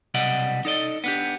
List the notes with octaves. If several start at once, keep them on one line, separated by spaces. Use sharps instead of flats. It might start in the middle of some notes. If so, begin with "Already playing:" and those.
B1 C3 G3 D5 D#5 F#5
D#4 A4 D5 D#5
B3 D4 G4